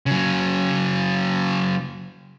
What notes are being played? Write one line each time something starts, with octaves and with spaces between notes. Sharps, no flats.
C#3 F#3